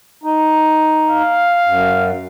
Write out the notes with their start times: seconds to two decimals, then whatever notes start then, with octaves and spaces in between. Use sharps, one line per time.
0.23 D#4
1.09 F5
1.65 F#2